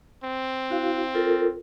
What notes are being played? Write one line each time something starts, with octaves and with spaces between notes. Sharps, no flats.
C4
E4 F#4 F5
F4 A4 A#4